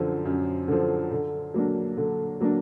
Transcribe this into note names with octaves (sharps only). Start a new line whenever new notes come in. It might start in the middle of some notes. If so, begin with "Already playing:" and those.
Already playing: F#2 D3 F3
F#2
D3 F3
D3
F#3 A#3 D4
D3
F#3 A#3 D4